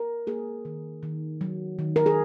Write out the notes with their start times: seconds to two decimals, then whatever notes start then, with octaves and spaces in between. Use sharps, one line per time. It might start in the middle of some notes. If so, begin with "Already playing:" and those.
Already playing: A#4
0.27 A#3 G#4
0.65 D#3
1.03 D#3
1.41 F#3
1.79 D#3
1.96 A#4
2.06 G#4